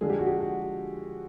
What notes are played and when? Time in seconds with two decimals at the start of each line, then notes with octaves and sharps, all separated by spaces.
0.01 D3 F3 G#3 G#4
0.10 G4
0.19 F#4
0.27 G4
0.40 F#4